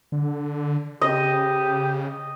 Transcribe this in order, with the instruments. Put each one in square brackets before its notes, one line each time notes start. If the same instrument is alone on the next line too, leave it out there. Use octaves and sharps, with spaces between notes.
[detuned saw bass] D3
[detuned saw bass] C#3 [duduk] G4 [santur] D#5